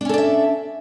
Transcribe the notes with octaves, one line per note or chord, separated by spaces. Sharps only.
C#4 D4 A4 D5 E5